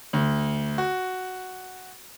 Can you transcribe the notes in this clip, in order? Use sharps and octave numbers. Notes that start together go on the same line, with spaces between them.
D2
F#4